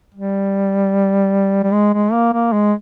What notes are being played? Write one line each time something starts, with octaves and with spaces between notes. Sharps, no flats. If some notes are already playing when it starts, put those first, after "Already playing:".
G3
G3
G#3
G#3
A#3
A#3
G#3